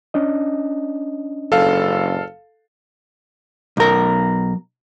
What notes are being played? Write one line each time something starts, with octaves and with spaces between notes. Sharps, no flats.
C#4 D4 D#5
F#1 A4 F5
B1 A#4